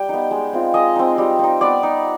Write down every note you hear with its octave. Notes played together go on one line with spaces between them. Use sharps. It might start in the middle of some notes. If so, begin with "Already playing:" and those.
Already playing: G3 G5
B3 D#4
G#3
C4 F4
G#3 D#5
C4 D#4
G3
C4 D#4
B3 D5
D#4